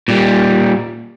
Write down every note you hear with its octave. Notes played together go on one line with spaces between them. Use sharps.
A#2 G3